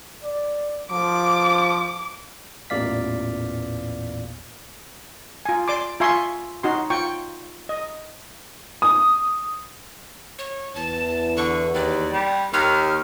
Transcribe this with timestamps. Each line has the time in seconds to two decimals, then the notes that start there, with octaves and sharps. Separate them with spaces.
0.24 D5
0.91 F3 D6
2.70 A1 E2 A#2 D5 F5 B6
5.45 F4 G#5
5.68 D5 C6 D6
6.00 F4 E5 G#5 C6 C#6
6.63 D#4 F#4 C6
6.90 F4 G5 C#6
7.69 D#5
8.82 D#6
10.39 C#5
10.75 E2 E3 A5
11.37 D3 C#6
11.74 D#2 D5
12.13 G3
12.53 D#2 F6